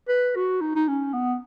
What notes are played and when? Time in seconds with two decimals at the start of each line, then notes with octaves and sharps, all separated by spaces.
0.09 B4
0.35 F#4
0.61 D#4
0.75 D#4
0.88 C#4
1.13 B3